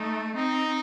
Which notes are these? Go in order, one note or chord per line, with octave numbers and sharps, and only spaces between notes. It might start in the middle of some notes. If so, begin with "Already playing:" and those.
Already playing: A3 D#4
C4 D#4